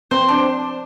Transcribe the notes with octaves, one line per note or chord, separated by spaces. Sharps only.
C4 C5
D4